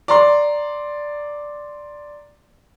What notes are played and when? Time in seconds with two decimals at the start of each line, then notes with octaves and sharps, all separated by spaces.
0.08 D5 A#5 C6